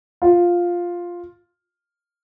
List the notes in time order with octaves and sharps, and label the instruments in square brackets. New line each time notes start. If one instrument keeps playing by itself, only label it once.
[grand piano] F4